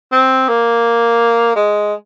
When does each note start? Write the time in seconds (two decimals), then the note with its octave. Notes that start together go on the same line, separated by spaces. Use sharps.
0.12 C4
0.48 A#3
1.56 G#3